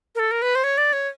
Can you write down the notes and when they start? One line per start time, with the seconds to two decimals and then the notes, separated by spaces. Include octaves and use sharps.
0.15 A#4
0.19 A4
0.31 A#4
0.42 B4
0.55 C5
0.64 C#5
0.78 D5
0.93 C#5